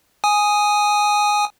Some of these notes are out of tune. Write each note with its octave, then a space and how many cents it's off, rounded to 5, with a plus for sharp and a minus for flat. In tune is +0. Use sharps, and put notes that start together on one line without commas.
G#5 +0 D#6 +0